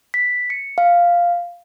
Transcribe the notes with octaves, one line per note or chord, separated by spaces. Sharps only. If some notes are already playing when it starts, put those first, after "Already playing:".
B6
C#7
F5